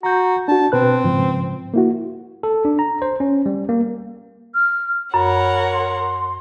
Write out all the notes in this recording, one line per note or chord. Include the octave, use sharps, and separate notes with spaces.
F#4 A#5 G6
D4 F#4 A5
B2 C4 B4 F#6
G#2 C#3 F3
A#3 E4 F#4
A4
D4
A#5
C5
C#4
G3
A#3
F6
F#2 A#4 C#5 F#5 B5
C6